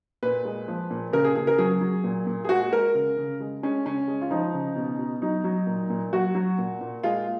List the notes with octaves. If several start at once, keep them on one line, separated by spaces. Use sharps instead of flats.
A#2 B4
G#3
F3
A#2
C#3 A#4
G#4
C#3 G#4
A#4
F#3 G#4
F#3
A#2
A#2
G#4
G#3 F#4
G#3 A#4
C#3
C#3
G#3
G#3 C#4
C#3 C#4
G#3
F4
F3 D#4
C#3
B2
B2
F#3 D#4
F#3
A#2
A#2
F#3 F#4
F#3
A#2
A#2
G#3 F4